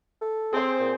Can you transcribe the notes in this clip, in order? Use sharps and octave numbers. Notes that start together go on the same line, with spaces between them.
A4
C4 G#4 C5
A#2